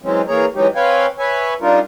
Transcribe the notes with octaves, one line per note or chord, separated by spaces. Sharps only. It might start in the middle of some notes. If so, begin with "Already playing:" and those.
E3 F#3 G#3 C4 C#4
E3 A#3 G#4 A#4 C#5 A#5
E3 F#3 G#3 C#4 D#4 G4
C4 B4 C#5 F5 G5 G#5
B4 C#5 E5 G#5
G3 D4 D#4 F4 A#4